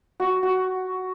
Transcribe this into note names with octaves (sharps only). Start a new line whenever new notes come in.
F#4
F#4